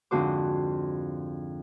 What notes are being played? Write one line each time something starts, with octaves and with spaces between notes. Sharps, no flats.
F2 G#2 D3 F#4 C5 D6